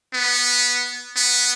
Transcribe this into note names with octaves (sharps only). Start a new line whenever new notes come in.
B3
B3